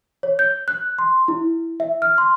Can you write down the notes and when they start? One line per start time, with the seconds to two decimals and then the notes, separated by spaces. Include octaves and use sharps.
0.23 C#5
0.39 G6
0.68 F#6
0.99 C6
1.28 E4
1.80 E5
2.02 F6
2.18 C6